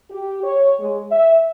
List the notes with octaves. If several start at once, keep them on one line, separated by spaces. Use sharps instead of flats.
G4
C#5
G#3
E5